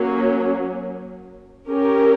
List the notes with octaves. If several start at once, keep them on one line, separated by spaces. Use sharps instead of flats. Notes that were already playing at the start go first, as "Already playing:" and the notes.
Already playing: F#3 A#3 C#4
C#4 G4 A#4